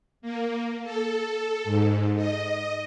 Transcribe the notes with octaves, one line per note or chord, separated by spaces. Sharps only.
A#3
A4
G#2
D#5